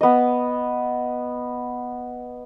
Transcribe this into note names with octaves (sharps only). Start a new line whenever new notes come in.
B3 D#5